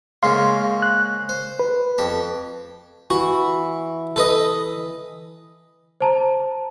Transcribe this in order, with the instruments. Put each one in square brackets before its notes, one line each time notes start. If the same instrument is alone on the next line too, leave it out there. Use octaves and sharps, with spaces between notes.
[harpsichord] G#2 C#3 A#3 [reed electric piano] F5 C6
[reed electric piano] F#6
[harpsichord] C5
[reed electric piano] B4
[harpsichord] F2 G4 A5
[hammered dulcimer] E3 [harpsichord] F#4
[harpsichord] A4 B4 D#5
[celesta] C5 A5 A#5